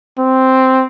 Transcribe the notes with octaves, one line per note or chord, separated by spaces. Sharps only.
C4